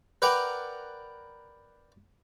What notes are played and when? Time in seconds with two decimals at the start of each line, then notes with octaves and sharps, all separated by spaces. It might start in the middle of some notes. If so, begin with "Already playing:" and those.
0.22 A#4 B4 D5 F#5 G5 A#5